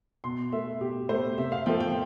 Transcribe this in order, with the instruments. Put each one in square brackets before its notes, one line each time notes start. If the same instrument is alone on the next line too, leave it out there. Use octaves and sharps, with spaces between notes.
[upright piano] B2 C6
A3 E5
B2 G4
A3 C5
C3 E5
F5
F3 A3 G5
G5